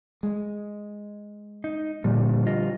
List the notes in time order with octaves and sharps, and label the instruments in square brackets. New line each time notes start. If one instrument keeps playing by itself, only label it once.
[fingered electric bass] G#3
[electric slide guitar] D#4
[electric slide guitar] A#2 [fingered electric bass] D3 F3 G3
[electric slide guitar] F4 D#5